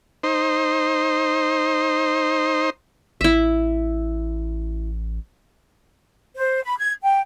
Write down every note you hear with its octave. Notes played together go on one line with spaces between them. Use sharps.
D#4 C5
A1 E4 E5
C5
B5
G#6
G5